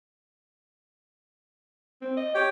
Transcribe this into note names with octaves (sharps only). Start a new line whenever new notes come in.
C4
D#5
G4 C#5 G5 D6